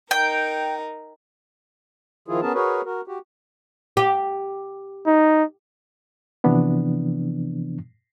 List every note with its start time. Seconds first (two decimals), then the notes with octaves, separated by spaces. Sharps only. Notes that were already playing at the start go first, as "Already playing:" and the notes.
0.11 D#4 A#4 G5
2.28 D#3 F3 E4 F4 G#4
2.42 B3 C#4 G#4 A#4 A5
2.54 F#4 G#4 A#4 B4 C#5
2.85 F#4 A#4
3.08 F#4 G4
3.97 G4
5.06 D#4
6.44 C3 E3 F3 B3 D4